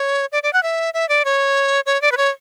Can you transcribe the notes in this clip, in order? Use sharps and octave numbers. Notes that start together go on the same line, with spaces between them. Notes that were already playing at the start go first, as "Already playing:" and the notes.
Already playing: C#5
D5
D5
F#5
E5
E5
D5
C#5
C#5
D5
B4
C#5